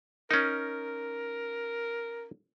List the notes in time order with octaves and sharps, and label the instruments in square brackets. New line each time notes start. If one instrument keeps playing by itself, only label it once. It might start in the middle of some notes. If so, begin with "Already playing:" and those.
[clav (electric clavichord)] C#4 D#4 [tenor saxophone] A#4